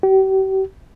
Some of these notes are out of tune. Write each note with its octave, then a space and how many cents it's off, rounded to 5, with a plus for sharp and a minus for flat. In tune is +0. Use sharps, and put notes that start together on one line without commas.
G4 -40